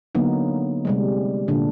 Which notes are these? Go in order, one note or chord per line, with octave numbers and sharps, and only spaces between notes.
D3 F#3 A#3 B3 D#4
C3 G3 G#3
A#2 D3 D4